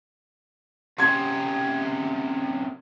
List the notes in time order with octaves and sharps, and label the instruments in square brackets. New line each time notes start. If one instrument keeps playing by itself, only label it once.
[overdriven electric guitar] F#2 C3 [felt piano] C6 G#6